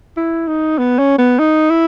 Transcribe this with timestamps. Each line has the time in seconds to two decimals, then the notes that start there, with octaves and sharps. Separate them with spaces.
0.17 E4
0.48 D#4
0.78 B3
0.98 C#4
1.18 B3
1.39 D#4
1.70 E4